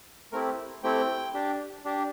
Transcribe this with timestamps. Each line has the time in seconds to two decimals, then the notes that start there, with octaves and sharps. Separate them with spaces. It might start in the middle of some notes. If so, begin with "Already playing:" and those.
0.32 A3 C4 E4 G4 A#4
0.83 A3 C4 E4 G4 G5
1.34 D4 G4
1.85 D4 G4